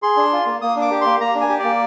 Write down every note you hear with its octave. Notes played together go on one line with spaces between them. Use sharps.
G#4 C6
D4
F4
A#3
A#3 D#6
D4
D6
G4
A#3 C6
A#3 A#5
D4
G#5
G4
A#3 D5